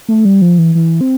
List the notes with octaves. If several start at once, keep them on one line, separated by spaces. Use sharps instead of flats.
A3
G3
F3
E3
E3
C4